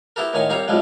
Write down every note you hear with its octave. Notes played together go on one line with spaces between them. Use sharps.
B3 E4 G4 A4 A#4
A2 D#3 A#3 C#5 G#5
C2 C4 G4 C#5 F5 A#5
B1 A2 C3 F3 G3 G#3